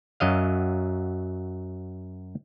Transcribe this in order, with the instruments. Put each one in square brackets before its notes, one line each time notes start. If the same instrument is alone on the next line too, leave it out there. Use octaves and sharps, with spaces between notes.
[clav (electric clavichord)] F#2 F#3 D#5 F5